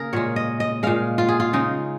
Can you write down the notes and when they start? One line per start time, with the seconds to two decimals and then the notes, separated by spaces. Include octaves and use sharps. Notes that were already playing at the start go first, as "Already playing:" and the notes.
Already playing: C#3 A#3 G#4 A#4
0.13 A#2 G#3 C#5
0.36 D#5
0.60 D#5
0.83 A#2 G#3 F5
1.18 F4
1.29 G#4
1.40 F4
1.53 C#3 G#3 D#4